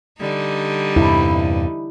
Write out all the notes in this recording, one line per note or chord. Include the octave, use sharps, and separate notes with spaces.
D3 G3 D#4
E2 G2 C3 E4